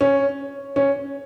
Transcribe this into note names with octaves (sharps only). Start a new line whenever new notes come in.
C#4
C#4